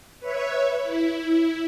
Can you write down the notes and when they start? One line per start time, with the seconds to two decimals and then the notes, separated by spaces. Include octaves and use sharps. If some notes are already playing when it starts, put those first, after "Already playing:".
0.20 B4 C#5 E5
0.83 E4